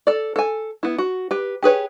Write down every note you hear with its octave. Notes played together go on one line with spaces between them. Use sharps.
A4 D5
A4 G#5
B3 E4
F#4
G4 B4
G4 G#4 B4 C#5